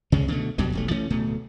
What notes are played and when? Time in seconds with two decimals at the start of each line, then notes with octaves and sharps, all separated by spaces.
0.12 C#2 C#3 G#3 C#4
0.28 B2 D3 G#3 A3
0.58 E2 B2 F#3 G3
0.73 F1 B1 A3
0.91 E3 A3 C#4
1.10 D1 B2 A3